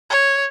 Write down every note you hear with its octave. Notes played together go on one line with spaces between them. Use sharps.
C#5